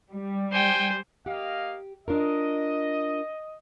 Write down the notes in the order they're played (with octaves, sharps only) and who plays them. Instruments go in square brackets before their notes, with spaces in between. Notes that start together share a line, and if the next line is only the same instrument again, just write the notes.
[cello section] G3
[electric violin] C5 [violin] G5 G#5
[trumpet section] A#3 D#5 F5 [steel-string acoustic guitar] G4
[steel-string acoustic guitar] D4 F4 A#4 [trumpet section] D#5